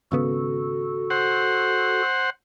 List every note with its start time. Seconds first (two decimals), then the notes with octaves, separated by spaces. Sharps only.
0.12 G#1 C#3 B3 F#4 A4
1.10 C5 F#5